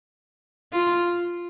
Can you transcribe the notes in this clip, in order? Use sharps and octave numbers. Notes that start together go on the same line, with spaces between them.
F4